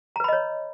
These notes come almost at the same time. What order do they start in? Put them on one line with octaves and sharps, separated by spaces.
A#5 B4 B5 D#5 C#5